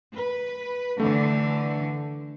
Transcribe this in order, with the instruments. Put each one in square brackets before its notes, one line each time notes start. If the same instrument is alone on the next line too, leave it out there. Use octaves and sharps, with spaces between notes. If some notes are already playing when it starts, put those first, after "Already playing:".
[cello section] B4
[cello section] D3 E3 [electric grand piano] A3